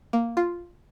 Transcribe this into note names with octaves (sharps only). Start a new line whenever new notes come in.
A#3
F4